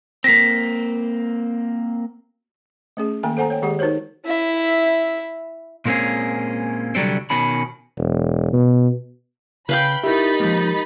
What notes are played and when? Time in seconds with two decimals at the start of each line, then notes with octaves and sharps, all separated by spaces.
0.24 A#3 C4 A#6 B6
2.97 A3 C#4 G#4
3.23 D#3 A#3 G5 G#5
3.37 A4 C5 F#5 G#5 A#5
3.50 C#5 G5
3.62 D#3 G#3 G4 G#4 F#5
3.79 D#4 F#4 A#4 C5 C#5
4.26 E4 E5
5.85 A#2 G#3 A#3 C4 C#4 G#4
6.95 C2 D3 F#3 G3 C4
7.30 B2 D#3 C#4 B5
7.98 E1
8.53 B2
9.69 C#3 B4 F5 G5 B5 G6 C7
10.04 D#4 E4 G4 A#4 E5 B5 A6
10.40 F3 G#3 A#3